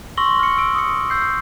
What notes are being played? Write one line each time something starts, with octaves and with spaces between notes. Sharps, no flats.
C6 C#6 E6 A#6 F#7 G7
F6 C#7
C#6 E6 D7
D#6 C#7
D#6 E6 G6 C7